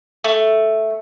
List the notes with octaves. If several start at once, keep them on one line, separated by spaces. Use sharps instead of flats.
A3